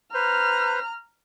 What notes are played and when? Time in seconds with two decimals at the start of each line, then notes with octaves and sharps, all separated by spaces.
0.14 B4 C5 A#5 F6